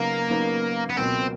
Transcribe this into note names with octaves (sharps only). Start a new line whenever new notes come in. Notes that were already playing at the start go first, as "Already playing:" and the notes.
Already playing: C#3 F#3 A#3 B3 D#4
C#3 F#3 B3 D#4
B3
C#2 B2 F#3 A#3 C4